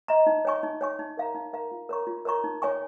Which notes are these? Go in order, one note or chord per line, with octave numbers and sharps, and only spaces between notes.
D#5 A#5
D#4
C#5 G#5 C#6
D#4
C#5 G#5 C#6
D#4
A#4 F5 A#5
D#4
A#4 F5 A#5
F4
A#4 C#5 A#5 C#6
F4
A#4 C#5 A#5 C#6
D#4
C#5 G#5 C#6